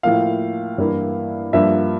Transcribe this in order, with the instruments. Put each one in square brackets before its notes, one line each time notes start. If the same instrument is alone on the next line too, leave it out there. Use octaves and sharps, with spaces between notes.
[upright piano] A2 F3 A#3 F4 F5
G2 E3 A#3 E4
G2 F3 A#3 E5